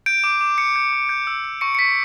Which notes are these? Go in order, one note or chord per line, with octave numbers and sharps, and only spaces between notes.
G6 D7
D6
D6
D6 C#7
G6
D6
G6
E6
E6
C#6 C#7
C#7
C#6 B6